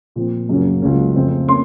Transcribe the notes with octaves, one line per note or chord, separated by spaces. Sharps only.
A#2 F3 C4
F#2 C#3 F#3 A#3 C#4
C#2 C#3 F#3 A#3 C#4
F2 C#3 A3 C4
A#3 C#4 C6